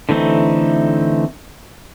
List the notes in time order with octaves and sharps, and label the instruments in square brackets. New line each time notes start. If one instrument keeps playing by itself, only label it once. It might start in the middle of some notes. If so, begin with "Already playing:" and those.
[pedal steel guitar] D3 E3 A3 C4 D#4